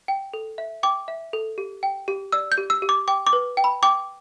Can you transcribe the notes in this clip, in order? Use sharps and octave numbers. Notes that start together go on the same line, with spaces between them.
G5
A4
E5
G5 D6
E5
A4
G4
G5
G4
D5 E6
G6
G4
E6
G4
D6
G5 D6
D6
B4
G5
B5
G5 D6